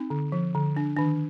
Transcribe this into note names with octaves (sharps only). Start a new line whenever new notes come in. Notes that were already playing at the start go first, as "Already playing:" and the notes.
Already playing: C4 D#4
D3
F3
D3
D4
D#3 D4